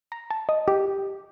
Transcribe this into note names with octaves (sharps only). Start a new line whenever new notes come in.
A#5
A5
D#5
G4